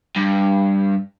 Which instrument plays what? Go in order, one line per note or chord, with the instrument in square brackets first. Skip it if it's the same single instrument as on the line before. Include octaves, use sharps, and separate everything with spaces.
[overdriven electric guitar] G2